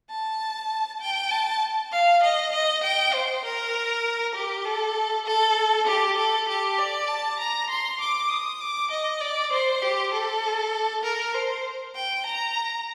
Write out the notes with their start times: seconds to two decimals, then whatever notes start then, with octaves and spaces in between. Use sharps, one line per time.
0.09 A5
1.01 G5
1.31 A5
1.92 F5
2.23 D#5
2.52 D#5
2.83 G5
3.14 C5
3.44 A#4
4.35 G4
4.65 A4
5.26 A4
5.87 G4
6.18 A4
6.48 G4
6.78 D5
7.08 A5
7.39 A#5
7.70 C6
8.00 D6
8.30 D#6
8.60 D6
8.91 D#5
9.21 D5
9.52 C5
9.82 G4
10.13 A4
11.03 A#4
11.34 C5
11.95 G5
12.26 A#5